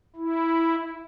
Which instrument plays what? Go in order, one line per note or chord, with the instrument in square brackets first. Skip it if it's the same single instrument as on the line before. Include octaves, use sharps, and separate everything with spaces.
[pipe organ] E4